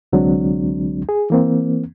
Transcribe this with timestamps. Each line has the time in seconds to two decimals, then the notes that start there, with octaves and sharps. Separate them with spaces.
0.13 C2 D3 F#3 G#3 C4 D4
1.09 G#4
1.30 E3 A#3 C4